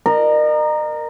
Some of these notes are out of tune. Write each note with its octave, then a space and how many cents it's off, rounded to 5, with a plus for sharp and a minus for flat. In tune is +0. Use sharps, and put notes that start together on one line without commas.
A#4 +0 D#5 -40